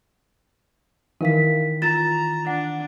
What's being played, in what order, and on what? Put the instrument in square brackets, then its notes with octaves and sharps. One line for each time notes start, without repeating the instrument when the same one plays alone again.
[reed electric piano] D#3 E3 [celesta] A#4 F5 B6
[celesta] F4 A6 E7 [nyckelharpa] A#5
[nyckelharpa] D4 [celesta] F#5